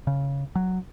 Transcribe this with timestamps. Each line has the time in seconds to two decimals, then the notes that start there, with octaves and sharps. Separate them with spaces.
0.07 C#3
0.56 F#3